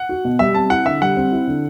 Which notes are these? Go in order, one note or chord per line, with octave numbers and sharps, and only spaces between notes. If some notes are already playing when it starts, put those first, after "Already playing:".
Already playing: F#5
F#4
B2
G3 E5
C4 A5
E4 F#5
D3 E5
G3 F#5
C4
E4
D3